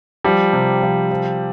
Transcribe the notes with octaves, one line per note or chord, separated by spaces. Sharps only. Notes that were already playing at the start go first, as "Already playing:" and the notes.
F3 G3
C3
F3
F3